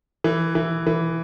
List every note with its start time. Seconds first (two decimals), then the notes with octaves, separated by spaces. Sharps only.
0.24 E3
0.55 E3
0.87 E3